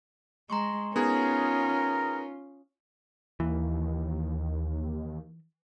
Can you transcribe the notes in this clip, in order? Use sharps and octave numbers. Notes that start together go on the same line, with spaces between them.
G#3 A#5 C6 C#6
B3 C#4 D#4 F4 G#4 A#4
D#2 E3